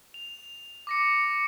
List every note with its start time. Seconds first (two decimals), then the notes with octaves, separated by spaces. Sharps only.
0.14 F7
0.87 D6 A#6 C#7